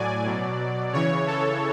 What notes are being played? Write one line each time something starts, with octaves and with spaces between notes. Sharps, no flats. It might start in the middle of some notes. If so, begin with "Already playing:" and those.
Already playing: A2 F#3 D5 G#5
B2 F#3
C#3 E3 C#5
A4